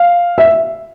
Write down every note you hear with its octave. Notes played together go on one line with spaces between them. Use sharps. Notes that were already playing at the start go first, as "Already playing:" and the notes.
Already playing: F5
E5